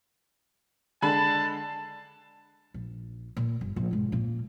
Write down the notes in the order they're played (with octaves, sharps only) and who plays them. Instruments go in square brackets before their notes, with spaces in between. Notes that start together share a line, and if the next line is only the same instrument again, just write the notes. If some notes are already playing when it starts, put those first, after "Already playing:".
[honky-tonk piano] D3 G#3 B5 [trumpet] A5
[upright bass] A#1
A#2
G1
A#1
G#2 B2
A#2 A#3